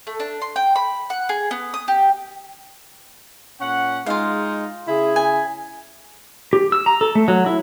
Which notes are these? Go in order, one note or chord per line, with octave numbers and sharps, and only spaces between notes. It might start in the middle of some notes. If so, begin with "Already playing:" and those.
A3
D4
C6
G5
B5
F#5
G#4
B3
D#6
G4
A#2 C#4 F#5
G#3 D#4 F4 F5
C#3 E4 G#4
G#5
G4
E6
A#5
A4
A3
F#3
E4